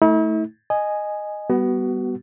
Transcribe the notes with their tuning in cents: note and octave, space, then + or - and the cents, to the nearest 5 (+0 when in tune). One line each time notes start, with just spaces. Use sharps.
A3 +0 E4 -45
D#5 -10 G#5 +0
G3 +0 B3 +0 F#4 +30